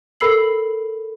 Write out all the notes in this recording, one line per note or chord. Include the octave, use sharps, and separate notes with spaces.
A4 A#4 B5 E6 C7 F#7